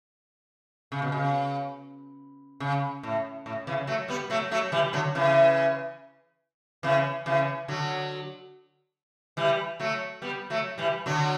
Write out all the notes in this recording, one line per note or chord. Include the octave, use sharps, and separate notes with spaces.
C#3
B2
C#3
C#3
A2
A2
C#3 E3
F#3 A3
G3 B3
F#3 A3
F#3 A3
E3 G3
D3 F#3
C#3 E3
C#3 E3
C#3 E3
D3 F#3
E3 G3
F#3 A3
G3 B3
F#3 A3
E3 G3
D3 F#3